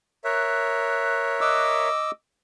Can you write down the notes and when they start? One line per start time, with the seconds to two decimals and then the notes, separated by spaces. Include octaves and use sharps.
0.24 A#4 C#5 E5 F#6
1.41 D#5 D6 E6